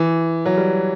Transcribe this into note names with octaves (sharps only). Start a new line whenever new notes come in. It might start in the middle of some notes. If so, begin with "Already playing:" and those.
Already playing: E3
F#3
G3